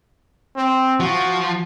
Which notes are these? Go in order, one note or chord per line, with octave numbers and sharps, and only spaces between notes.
C4
F3 F#4